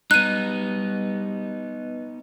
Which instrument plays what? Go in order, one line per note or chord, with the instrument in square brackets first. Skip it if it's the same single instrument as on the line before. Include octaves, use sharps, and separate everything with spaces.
[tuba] G3 [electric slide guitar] B3 D#4 [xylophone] F#6 D#7